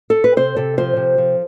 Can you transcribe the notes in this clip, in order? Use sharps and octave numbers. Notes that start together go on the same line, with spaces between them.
A4
B4
C3 C5
C3 A4
F3 C5
C3
F3